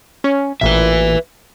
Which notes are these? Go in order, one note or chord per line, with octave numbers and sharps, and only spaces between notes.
C#4
A1 A#2 B4 E5